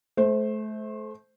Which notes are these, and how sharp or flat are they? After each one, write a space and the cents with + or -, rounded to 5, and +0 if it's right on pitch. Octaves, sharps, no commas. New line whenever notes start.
A3 -30 C5 +0